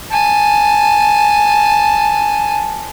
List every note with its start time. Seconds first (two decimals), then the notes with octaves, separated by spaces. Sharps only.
0.10 G#5 A5